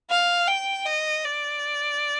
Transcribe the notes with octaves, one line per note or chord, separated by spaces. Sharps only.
F5
G5
D#5
D5